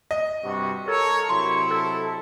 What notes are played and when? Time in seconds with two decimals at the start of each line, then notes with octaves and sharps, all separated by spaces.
0.11 D#5
0.44 G2 C3 F#4
0.87 A4 A#4 C#5
1.29 C3 F#3 E4 C6 C#6
1.70 A4